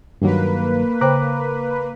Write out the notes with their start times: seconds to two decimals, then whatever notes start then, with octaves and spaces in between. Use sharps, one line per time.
0.22 G2 D#3 F#3 A#3 B4
1.01 C#3 C5 G5 A#5 D6 F#6